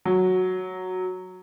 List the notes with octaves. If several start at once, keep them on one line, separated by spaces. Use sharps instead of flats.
F#3